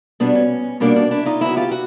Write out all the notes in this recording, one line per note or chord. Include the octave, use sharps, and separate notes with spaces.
B2 G3 B3 D4
C#4
B2 G3 A#3 C#4 D4
D4
D4 E4
D#4 F4
C#3 F#3 B3 E4 F#4
F4 G4
F#4